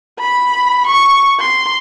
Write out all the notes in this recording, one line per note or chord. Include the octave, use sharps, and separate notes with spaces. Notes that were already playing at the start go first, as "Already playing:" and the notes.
B5
C#6
C6